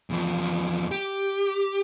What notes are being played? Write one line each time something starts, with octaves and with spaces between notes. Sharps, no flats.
E2 F3
G4